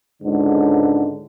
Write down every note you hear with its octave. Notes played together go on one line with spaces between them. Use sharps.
C#2 G#2 D3